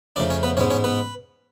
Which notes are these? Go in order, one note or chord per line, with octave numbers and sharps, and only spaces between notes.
F2 C#3 F3 A3 D4 D5
C#4 C#5
B3 B4
A1 G#2 G#3 B3 C#4 C#5
C#4 C#5
B3 B4